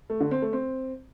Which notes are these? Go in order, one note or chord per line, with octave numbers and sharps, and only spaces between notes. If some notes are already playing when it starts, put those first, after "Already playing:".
A3
D3
C4
A3
C4